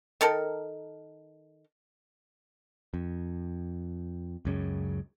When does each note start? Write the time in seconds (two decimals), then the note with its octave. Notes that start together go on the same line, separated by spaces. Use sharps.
0.21 D#3 A4 A#4
2.94 F2
4.45 C#2 F#2 C#3